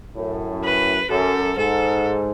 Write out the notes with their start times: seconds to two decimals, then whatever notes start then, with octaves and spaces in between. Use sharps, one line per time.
0.16 F#2 A2
0.64 B4
1.10 F#2 A4
1.56 G#2 A4